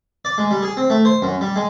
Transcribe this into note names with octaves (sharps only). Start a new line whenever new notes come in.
D5
G#3
G3
G#4
C4
A3
C5
F#2
G3
G#3